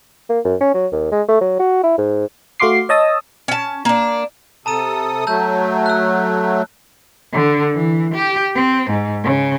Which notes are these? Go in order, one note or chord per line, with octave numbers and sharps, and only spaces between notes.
A#3
F#2
C#4
F#3
D#2
G#3
A3
F#3
F#4
E4
G#2
A3 F#4 F5 C6 D6 C7
C#5 D#5 A5 D#6 E6
C#4 A5
A#3 D4
C3 A4 A5 A#5 D#6 D#7
F#3 A3 A5 E6 G6
E6 F#6
D3
E3
G4
C4
G#2
C#3